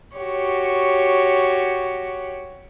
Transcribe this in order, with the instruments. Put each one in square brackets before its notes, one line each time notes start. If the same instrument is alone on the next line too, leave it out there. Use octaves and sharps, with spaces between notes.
[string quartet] F#4 G4 C#5